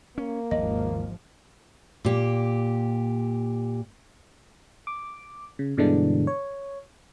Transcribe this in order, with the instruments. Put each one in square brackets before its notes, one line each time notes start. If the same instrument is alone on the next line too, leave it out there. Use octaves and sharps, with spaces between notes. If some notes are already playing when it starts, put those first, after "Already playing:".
[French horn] A#3 [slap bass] C#4
[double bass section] G#1 F3 [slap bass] D#2 [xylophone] D#5
[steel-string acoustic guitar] A#2 G4
[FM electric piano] D6
C#3
G2 B2 D3 E3 G#3 D4
C#5